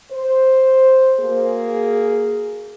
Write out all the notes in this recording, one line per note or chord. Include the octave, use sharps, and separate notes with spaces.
C5
A#3 F#4 G#4